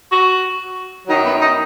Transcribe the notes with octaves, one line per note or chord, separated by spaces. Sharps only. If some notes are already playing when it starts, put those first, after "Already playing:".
F#4
F#2 D#3 F#3 D#4
B3
D#4